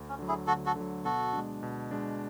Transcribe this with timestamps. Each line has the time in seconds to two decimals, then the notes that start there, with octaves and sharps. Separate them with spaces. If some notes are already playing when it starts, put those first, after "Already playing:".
Already playing: D2
0.09 C#4
0.19 D3 F#3
0.28 E4 G#4
0.47 D2 F#4 A4
0.66 F#4 A4
0.76 D3 F#3
1.05 B2 F#4 A4
1.33 G#3 D4
1.63 B2
1.91 G#3 D4